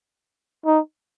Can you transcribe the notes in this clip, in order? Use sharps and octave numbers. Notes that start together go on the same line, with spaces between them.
D#4